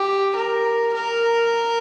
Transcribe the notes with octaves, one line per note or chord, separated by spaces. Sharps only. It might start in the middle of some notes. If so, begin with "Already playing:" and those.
Already playing: G4
A#4
A#4